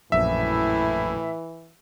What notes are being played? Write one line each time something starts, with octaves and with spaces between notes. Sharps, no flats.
A#1 F#2 A2 E3 E5